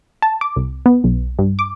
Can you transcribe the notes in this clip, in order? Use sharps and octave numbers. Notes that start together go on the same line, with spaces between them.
A5
D6
C2
B3
B1
G2
D6